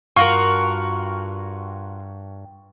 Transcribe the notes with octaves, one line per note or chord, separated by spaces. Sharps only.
G2 F4 F#4 A#4 C#6